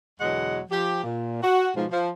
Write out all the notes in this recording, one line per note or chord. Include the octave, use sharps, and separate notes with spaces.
E2 B2 D3 F#3 G#3 F#5
F3 G4
A#2
F#4
G#2 B2 F3
F3